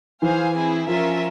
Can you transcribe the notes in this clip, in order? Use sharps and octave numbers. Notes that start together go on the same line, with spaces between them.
E3 G#4 C5 F5 G#5
C4 E4 G#4
F3 C#4 F4 A#4 E5